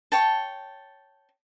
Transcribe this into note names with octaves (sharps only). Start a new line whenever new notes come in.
C#5 G5 A5